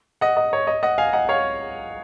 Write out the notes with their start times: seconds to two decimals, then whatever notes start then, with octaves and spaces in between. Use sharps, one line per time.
0.21 D#5 F#5
0.37 D#5
0.53 C#5
0.67 D#5
0.83 D#5 F#5
0.98 F5 G#5
1.13 D#5 F#5
1.29 C#5 F5